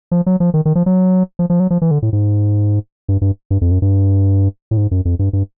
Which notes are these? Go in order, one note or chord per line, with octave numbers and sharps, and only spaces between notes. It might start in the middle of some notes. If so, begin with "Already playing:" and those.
F3
F#3
F3
D#3
D#3
F3
F#3
F3
F3
F#3
F3
E3
D3
A2
G#2
G2
G2
G2
F2
F#2
G2
A2
G#2
F#2
F2
G2
G2